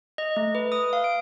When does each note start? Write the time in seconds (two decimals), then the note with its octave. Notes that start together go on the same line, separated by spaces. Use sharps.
0.18 D#5
0.37 A3
0.55 B4
0.72 D#6
0.93 F5
1.04 D7